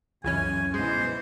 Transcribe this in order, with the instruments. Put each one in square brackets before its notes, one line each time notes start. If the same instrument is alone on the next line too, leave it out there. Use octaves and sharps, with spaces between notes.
[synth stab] C#2 E3 C#4 [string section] F#2 [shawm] G#5
[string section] G#2 B2 E3 [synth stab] G#3 [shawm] C5